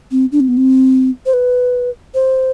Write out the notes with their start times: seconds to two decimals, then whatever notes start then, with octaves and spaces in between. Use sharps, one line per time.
0.11 C4
0.32 D4
0.40 C4
0.48 B3
0.57 C4
1.26 C5
1.34 B4
2.15 C5